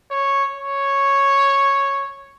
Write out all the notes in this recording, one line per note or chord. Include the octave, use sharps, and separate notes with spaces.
C#5
C#5